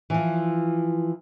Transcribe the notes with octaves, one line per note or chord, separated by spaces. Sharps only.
E3 F3